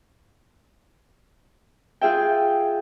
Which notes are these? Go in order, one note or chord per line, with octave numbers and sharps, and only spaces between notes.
F4 G#4 E5 G5